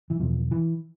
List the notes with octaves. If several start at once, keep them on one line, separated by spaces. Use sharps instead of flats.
E3
E2 B2 F3
E3